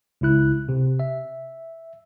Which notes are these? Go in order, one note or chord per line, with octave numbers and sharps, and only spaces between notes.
C#2 C#3 E4 F#6
C3
E5